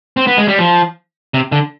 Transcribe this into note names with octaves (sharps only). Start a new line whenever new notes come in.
C4
B3
G#3
G3
F3
C3
D3